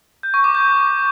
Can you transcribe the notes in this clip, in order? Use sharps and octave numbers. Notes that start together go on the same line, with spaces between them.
G6
C#6
D6
G6